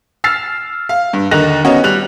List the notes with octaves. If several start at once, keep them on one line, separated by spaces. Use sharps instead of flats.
E6 F6 A6 C7
F5
G2
D#2 D3 D#4 F#6 A#6 F7
B3 C#4 D#4 F#4 C#5 D#5
G3 F#6 F7